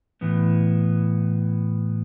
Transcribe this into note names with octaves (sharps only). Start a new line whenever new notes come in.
A2 E3 B3